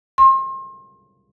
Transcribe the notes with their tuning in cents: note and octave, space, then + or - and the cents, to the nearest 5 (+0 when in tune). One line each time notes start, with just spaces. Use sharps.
C6 +35